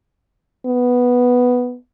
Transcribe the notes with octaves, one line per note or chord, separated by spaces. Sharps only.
B3